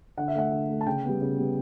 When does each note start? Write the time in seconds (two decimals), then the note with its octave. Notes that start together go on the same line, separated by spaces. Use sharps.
0.17 D3 F#5
0.28 E5
0.35 A3 F#5
0.52 D3
0.69 A3
0.81 A5
0.87 C#3 G5
1.04 G3 B3
1.21 C#3
1.38 G3 B3